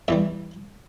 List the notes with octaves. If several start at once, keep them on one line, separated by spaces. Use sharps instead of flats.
E2 E3 G3 E5